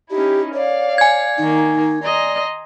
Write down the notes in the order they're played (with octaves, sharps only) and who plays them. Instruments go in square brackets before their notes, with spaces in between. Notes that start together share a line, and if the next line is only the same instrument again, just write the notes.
[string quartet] C#4 D#4 E4 [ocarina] G4
[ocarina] C#5 [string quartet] D5 F5
[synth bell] G#5 G#6
[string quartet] D#3 A#3 [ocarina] D#4
[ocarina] D5 [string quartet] D#5 A#5 C6